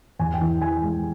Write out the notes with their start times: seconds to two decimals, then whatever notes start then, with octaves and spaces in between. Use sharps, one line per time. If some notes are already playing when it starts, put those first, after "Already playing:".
0.19 E2 G#5
0.34 G5
0.41 E3
0.61 E3 G#5
0.82 G#3